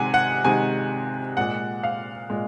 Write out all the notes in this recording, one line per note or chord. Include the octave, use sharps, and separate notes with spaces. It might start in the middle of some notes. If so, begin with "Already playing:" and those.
Already playing: C3 D#3 G#3 F#5 G#5
F#5
C3 D#3 G#3 G#5
A#2 G#3 F#5
F5
A#2 G#3